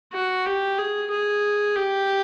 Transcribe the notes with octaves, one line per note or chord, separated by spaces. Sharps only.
F#4
G4
G#4
G#4
G4